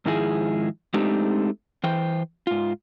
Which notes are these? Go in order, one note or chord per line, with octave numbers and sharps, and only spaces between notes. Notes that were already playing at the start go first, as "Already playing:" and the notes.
G#2 D#3 F3 G#3 E4 G#4
G#3 A3 C4 D4 D#4 G4
E3 C5 G5
G#2 F4